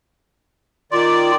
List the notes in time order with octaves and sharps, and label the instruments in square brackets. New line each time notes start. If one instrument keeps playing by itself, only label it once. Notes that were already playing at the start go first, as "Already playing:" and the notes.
[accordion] D#3 D5 [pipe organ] F4